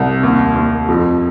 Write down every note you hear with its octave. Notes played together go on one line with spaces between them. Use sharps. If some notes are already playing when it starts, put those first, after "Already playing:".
Already playing: C2
D#2
D#2
F2